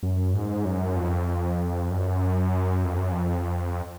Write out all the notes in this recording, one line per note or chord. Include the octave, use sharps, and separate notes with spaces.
F#2
G#2
F#2
F2
F#2
F2
F#2
F2